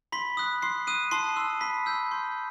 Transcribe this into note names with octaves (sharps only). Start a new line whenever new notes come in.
B5 C6 B6
D#6 F#6
C6 C7
D#6 F#6 D#7
A5 C6 C7
C6 E6
B5 B6
E6 G6
C6